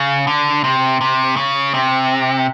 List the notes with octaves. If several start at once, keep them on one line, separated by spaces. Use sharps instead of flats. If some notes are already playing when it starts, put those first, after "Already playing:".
Already playing: C#3
D3
C3
C3
C#3
C3